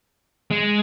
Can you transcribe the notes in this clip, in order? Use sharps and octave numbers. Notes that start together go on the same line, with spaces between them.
G#3